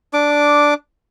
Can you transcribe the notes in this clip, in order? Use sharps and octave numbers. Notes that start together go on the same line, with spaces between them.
D4 D6